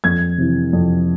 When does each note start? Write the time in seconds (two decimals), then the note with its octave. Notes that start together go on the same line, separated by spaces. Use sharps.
0.04 F2 G#6
0.38 C3 E3
0.73 F2